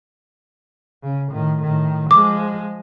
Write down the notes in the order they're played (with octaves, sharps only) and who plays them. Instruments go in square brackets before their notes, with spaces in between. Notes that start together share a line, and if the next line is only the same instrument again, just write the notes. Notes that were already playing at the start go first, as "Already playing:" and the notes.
[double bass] C#3
A2 D#3
A2 D#3
[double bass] F3 G#3 [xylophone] D6